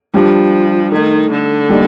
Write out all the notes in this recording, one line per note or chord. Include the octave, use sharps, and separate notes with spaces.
F3 G3 D4 G4
D#3 A3 D#4 A4
D3
G3 A#3 D#4 G4 D5